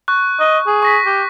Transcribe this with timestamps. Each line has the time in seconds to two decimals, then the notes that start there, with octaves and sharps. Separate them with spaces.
0.08 C#6 F#6
0.40 D#5
0.67 G#4
0.83 C#6 A#6 B6
1.06 G4